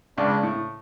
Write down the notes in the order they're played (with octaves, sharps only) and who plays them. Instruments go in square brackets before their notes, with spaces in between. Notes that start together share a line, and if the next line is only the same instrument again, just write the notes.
[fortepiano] C#2 C#3 [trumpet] D4
[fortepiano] A2